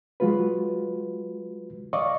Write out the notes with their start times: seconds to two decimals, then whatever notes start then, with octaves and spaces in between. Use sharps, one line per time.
0.20 F#3 G#3 F4 F#4 B4
1.93 D5 D#5 F5 C#6 D6